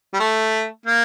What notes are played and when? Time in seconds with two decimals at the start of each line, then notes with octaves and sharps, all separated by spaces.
0.14 G3
0.19 A3
0.86 A#3